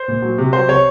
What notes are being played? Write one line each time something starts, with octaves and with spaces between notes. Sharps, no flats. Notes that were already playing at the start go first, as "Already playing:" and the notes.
Already playing: C5
A#2
F#3
C3
F#3 C5
C3 C#5